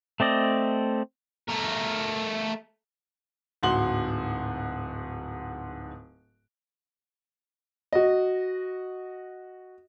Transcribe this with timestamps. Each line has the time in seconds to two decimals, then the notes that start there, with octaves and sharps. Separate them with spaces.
0.20 A3 C4 D5 D#5
1.48 A3 A#4
3.63 D1 G#2 F#4 C6 F#7
7.93 F#4 D#5